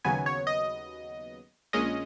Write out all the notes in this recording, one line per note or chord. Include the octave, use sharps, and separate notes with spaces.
D#2 C#3 F#3 B3 G#5
C#5
D#5
A#1 A#2 G#3 C#4 D#5